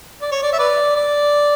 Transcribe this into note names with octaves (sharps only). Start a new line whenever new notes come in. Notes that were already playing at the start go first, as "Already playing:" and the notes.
D5
C#5
D5
E5
B4 D5
D5